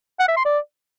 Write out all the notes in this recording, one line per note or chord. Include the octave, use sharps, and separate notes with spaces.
F#5
E5
C6
D5